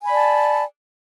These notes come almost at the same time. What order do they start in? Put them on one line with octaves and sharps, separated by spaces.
G#5 B5 D5 A5